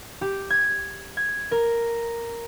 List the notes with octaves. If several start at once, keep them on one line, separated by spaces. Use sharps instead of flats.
G4
G#6
G#6
A#4